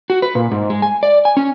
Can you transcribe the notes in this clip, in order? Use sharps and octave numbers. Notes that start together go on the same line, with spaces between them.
F#4
B4
A#2
G#2
G#3
G#5
D5
G#5
C#4